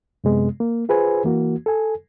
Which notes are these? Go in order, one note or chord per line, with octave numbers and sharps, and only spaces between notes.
F#2 C3 G#3 B3
A#3
F4 G#4 B4 C5 G#5
E3 A#3 F#4
A4 G#5